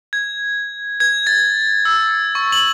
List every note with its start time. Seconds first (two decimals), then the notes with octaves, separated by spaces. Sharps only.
0.13 G#6
1.00 G#6
1.27 A6
1.85 E6
2.35 C#6
2.52 F#7